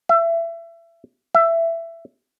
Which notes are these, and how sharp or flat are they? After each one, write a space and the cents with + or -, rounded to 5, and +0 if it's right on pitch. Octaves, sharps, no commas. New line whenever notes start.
E5 +25
E5 +15